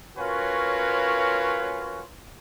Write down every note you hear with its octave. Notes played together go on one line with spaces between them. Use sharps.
C#4 F4 F#4 A#4 B4 C#5